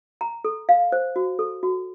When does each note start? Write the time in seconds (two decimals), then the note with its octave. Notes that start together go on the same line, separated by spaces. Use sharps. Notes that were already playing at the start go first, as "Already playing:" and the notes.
0.21 A#5
0.44 A4
0.69 F5
0.92 C5
1.16 F#4
1.39 A4
1.63 F#4